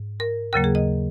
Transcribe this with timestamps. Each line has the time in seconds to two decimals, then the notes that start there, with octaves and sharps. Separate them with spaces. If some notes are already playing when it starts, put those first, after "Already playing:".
Already playing: G#2
0.20 A#4
0.53 D#2 C#3 F#3 A#3 A#4
0.64 G#4
0.75 D#5